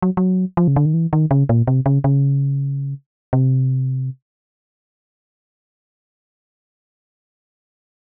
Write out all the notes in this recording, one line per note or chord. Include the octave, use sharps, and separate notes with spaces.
F#3
F#3
F3
C#3
D3
D#3
E3
D#3
C#3
A#2
C3
C#3
C#3
C3